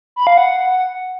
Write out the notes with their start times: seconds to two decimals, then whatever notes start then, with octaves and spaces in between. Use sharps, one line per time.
0.16 B5
0.27 F5
0.37 F#5